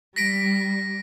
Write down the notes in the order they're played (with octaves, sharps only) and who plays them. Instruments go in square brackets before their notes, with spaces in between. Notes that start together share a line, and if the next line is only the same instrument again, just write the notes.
[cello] G3 [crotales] A#6 B6 D7